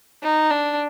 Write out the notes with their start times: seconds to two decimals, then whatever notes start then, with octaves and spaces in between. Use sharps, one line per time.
0.23 D#4
0.50 D4